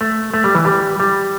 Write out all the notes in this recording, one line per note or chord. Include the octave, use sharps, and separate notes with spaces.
A3
A3
G3
E3
G3
G3